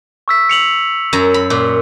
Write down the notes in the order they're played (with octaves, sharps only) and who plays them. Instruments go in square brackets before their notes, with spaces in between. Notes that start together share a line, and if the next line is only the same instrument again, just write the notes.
[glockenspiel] C#6 E6 B6
C#7 F7 F#7
[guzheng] F#2 A#5
B5
A#2